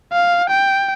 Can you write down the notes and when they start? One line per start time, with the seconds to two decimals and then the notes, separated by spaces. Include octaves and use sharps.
0.13 F5
0.50 G5